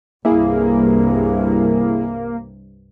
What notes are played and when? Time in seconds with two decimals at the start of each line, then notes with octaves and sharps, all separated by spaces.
0.25 C2 G2 C3 A#3 E4 G#4